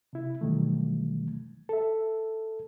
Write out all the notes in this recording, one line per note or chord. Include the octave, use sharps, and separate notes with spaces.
C3 E4
B2 D#3 E3 F#3 G3 A3
A4 E5